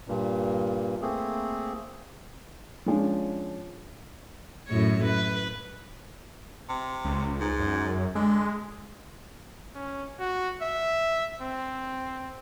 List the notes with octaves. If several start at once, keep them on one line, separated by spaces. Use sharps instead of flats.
G2 A#2
A3 A#3 C4 G#4
F3 G#3 C#4 D4
F#2 A2 C#5
B4
C3
C#2
G#2
F#2
D3 G#3
C#4
F#4
E5
C4